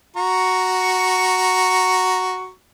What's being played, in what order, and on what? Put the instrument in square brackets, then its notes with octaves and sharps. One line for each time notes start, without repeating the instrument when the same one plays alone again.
[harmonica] F#4 A#5 C#6